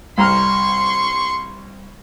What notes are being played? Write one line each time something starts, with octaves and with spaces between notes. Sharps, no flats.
C2 A#5 C6 C#6 F6